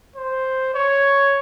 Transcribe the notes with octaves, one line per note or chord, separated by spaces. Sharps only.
C5
C#5